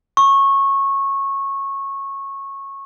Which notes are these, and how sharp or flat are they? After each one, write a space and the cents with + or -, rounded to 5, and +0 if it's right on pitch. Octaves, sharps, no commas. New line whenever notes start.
C#6 -15